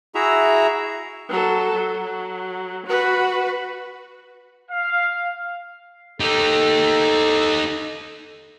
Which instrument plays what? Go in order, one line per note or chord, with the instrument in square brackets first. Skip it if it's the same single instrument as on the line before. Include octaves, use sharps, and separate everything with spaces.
[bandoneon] E4 F#4 G#4 E5 A#5
[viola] F#3 A4
F#3
F#4 B4
[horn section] F5
[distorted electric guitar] D#4 G4 [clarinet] A4